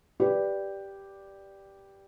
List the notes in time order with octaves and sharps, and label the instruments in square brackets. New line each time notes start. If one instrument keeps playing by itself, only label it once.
[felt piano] G4 B4 D5